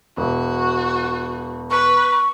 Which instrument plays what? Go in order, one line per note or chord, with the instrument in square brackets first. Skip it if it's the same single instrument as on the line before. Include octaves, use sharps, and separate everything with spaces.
[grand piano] E1 [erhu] F#4
[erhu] B4 [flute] C#6